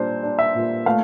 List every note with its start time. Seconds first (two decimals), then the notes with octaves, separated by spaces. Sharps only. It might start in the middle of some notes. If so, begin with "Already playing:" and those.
Already playing: A#2 G3 D4 C5
0.23 D4
0.39 E5
0.55 A#2
0.86 A3 F5